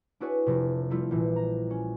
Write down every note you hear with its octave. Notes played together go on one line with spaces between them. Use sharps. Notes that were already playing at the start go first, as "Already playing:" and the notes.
D4 E4 F#4 G#4 B4 C#5
F1 C3
F3 G3 A3 E4 F4
A#1 A#2 E3
A#5
C#4